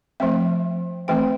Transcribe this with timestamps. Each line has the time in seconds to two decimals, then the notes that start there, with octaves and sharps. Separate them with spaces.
0.20 F3 A3 C4 E5
1.08 E3 A3 C4 G5